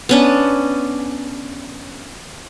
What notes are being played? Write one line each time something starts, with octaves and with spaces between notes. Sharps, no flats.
B3 C#4 D4